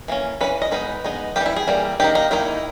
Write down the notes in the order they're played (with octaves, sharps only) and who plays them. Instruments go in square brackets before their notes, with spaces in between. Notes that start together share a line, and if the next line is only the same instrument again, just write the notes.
[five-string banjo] E3 A#3 C#4
E3 A#3 C#4 B4
D#5
G#3 B3 D#4 B4
G#3 B3 D#4
E3 G3 A#3 G4
E4
G#4
E3 G3 A#3
D#3 A#3 D#4 G4
D#4
D#3 A#3 D#4 E4